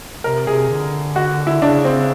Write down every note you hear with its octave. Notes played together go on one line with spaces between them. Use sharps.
C3 A#4
C3 G#4
D3
F#4
E4
C#3 D4
C4